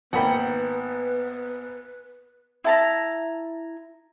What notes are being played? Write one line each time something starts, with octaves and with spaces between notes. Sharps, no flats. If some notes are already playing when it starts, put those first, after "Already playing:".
G#1 A#3 B3 B4 F#5 G5 B5
E4 A5 A#5